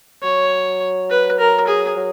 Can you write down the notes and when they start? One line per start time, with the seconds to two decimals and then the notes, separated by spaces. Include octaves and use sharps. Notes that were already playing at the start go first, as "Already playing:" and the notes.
0.23 F#3 C#5
1.10 B4
1.39 A#4
1.67 G#4
1.96 F#3